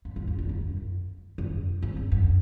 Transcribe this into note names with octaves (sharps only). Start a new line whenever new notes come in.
F2
F#2
F2
F#2
F#2
F#2
F2
F#2
F#2